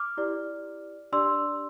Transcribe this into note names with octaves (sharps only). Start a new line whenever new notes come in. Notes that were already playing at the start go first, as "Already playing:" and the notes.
Already playing: D6 F6
E4 G4 D5
D4 G4 D5 C6 E6